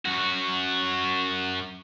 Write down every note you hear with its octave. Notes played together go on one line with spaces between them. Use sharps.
F#2 F#4